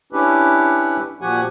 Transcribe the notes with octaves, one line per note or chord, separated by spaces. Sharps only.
C#4 D4 E4 G4 B4
A#2 F3 F#4 G4 F#5 G#5